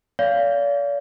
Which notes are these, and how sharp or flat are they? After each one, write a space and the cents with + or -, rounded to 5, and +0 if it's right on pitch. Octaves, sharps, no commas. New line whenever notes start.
D5 -45 F5 -10